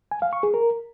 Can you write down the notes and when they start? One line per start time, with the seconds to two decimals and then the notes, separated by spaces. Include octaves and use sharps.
0.11 G#5
0.22 F5
0.33 C#6
0.43 G#4
0.54 A#4